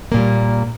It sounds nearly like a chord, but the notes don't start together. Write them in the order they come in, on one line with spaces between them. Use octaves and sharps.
A#3 A#2 G3